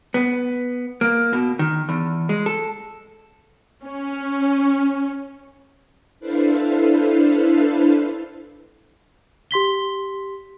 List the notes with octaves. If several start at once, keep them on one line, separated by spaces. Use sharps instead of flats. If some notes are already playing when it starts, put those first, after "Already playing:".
B3
A#3
B2
D#3
E2
G#3
A4
C#4
D4 E4 A4 B4 C5 F5
G4 C6 B6 G7